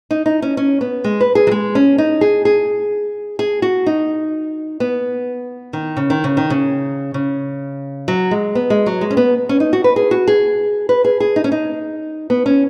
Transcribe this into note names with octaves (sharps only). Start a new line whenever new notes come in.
D#4
D#4
C#4
C#4
B3
G#3
B4
G#4
F#3
G#3
C#4
D#4
G#4
G#4
G#4
F#4
D#4
B3
D#3
C#3
D#3
C#3
D#3
C#3
C#3
F#3
G#3
B3
G#3
F#3
G#3
C#4
B3
C#4
D#4
F#4
B4
G#4
F#4
G#4
B4
G#4
G#4
D#4
C#4
D#4
B3
C#4